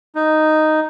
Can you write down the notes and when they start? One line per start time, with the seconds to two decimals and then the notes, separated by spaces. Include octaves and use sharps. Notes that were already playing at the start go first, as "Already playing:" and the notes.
0.15 D#4